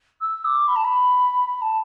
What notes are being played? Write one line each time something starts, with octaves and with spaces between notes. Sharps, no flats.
E6
D6
B5
A5
B5
A5